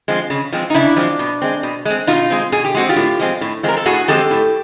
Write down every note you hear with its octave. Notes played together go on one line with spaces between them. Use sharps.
F3 G#3 C4
C#3
F3 G#3 C4
D#4
C#3 D4 E4
F3 G#3 C4
B2
G#3 C4
B2
G#3 C4
B2 D#4 F4
G#3 C4
B2 G#4
G4
G#3 C4 F#4
F4 G4
A2
F3 G#3 C4
A2
F3 G#3 C4 A#4
A4
A2 F#4 G#4
F3 G#3 C4 G4 A4
A2